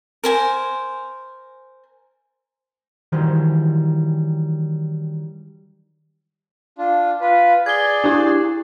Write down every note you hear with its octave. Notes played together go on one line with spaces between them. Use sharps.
A#4 C5 G#5
D#3 E3 F#3 G3 C5
D4 F4
F4 B4
G#4 D5 G#6 G7
D4 E4 G4